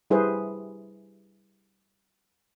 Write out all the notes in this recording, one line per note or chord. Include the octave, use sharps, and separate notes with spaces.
G3 E4 G#4 B4 C5